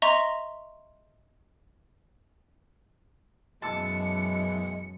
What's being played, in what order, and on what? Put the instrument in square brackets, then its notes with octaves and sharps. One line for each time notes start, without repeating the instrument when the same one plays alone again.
[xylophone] D#5 E5 A#5 C6 C#6
[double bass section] F#2 [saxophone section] B2 E3 G#3 [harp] A5 D6 E6 [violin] C#7